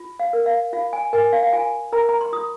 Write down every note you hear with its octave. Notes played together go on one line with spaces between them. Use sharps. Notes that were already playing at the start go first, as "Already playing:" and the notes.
Already playing: F4
F5
A#4
F5
F4 F5
G#5
A#4 G#5
F5
F5
F4 G#5
A#4 A#5
A#5
C6
F4 D#6